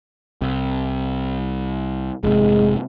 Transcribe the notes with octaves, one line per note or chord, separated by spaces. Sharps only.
C2 C3
F1 G#2 C3 G#3